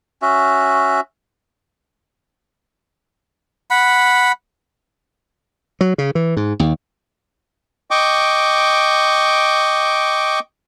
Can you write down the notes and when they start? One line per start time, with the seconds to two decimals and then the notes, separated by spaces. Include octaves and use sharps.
0.22 C#4 F#4 E5
3.70 F#5 B5
5.81 F#3
5.98 C#3
6.15 E3
6.37 G#2
6.60 D#2
7.91 D#5 G5 C#6 D6